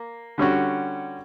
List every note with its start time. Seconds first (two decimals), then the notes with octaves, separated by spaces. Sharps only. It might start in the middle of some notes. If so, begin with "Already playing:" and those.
Already playing: A#3
0.38 D3 G3 C#4 F#4